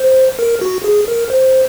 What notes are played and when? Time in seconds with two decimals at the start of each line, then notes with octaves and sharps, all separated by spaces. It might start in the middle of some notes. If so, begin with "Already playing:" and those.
Already playing: C5
0.39 A#4
0.61 F#4
0.84 G#4
1.08 A#4
1.30 C5